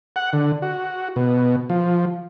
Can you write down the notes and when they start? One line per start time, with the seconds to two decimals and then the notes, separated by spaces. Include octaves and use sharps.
0.16 F#5
0.33 D3
0.62 F#4
1.16 B2
1.70 F3